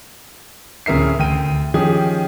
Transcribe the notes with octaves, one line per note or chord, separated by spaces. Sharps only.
D1 C#3 A#4 E5 C7
D2 G5 D#7
D#3 F3 C#4 G4 G#4